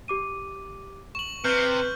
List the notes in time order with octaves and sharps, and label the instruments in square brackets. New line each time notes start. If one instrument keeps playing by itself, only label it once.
[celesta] G4 D6 D#7
[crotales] C#6 F#7 [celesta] E7
[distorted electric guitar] C3 [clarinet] B4 [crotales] F6 G6